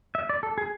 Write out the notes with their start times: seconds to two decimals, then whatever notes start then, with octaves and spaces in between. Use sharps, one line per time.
0.15 E5
0.29 D5
0.43 A4
0.58 G#4